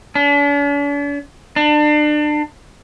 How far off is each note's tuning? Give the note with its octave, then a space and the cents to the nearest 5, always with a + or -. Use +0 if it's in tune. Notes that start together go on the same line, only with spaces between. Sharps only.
D4 -45
D4 +30